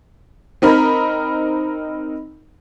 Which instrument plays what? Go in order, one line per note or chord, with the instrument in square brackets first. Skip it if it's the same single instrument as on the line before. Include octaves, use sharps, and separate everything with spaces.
[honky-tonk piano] C4 D#4 A#4 B5